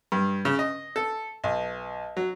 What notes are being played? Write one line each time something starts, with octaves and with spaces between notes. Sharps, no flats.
G2
C#3
D#5
A4
B1
F#3